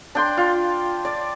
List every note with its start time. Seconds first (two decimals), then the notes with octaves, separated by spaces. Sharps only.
0.15 D4 G5 C6
0.37 F4
1.05 D5